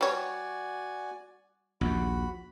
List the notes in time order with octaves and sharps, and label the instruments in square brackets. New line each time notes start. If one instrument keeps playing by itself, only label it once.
[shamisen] G3 C#5 [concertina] F#4 D5 G#5
[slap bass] A#1 D#2 [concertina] F#4 B5